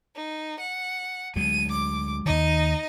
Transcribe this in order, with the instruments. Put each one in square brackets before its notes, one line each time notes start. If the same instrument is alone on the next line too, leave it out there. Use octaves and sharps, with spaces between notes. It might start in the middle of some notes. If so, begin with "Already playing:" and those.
[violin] D#4
F#5
[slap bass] D2 F#3 G#3 [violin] D#7
[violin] D6
[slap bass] D#2 D#3 [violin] D#4 D#5